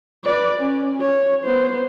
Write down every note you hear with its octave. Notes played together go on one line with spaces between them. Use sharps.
B4 D5
C#4
C#5
B3 C5